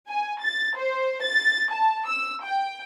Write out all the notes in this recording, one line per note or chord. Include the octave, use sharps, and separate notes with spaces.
G#5
A6
C5
A6
A5
E6
G5